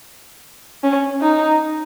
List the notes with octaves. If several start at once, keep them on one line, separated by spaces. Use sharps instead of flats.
C#4
D#4